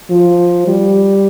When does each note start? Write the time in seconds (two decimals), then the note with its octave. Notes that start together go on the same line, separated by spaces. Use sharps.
0.10 F3
0.68 G3